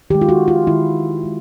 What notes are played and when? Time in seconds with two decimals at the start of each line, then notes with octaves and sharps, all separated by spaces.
0.10 D#3 G#3 G4
0.22 F4
0.29 F#4
0.48 F4
0.67 D#3 G#3 E4
1.24 D#3 G#3